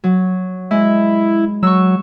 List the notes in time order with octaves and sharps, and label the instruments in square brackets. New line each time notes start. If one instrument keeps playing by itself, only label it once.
[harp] F#3
[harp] G#3 [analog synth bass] E4
[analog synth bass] F#3 [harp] C#6 E6